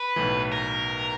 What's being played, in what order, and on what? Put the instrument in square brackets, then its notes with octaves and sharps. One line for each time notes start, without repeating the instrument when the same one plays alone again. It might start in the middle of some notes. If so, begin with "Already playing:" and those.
Already playing: [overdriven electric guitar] B4
[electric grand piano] B1 A2 E3
[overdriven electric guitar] A#4